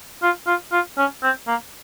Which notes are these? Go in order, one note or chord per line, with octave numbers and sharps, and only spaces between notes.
F4
F4
F4
C#4
C4
A#3